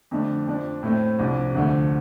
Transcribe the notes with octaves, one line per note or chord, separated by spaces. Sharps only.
F2 D3 A3 D4
F2 F3 D4
A2 A3 C4
C2 C3 F3 D4
D2 D3 F3 A3 D4